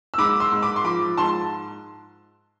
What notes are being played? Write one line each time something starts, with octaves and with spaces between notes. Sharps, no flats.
E6
G#2 B5 D6
C6 E6
G#2
B5 D6
C6
F3 B5 D6
G#2 A5 C6